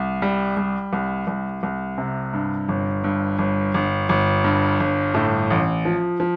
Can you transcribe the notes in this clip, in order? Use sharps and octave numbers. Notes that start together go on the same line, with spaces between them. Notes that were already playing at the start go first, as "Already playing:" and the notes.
Already playing: C2
G3
G3
C2
C2
C2
C3
G2
G1
G2
G1
G1
G1
G2
G1
A2
A1
F3
F3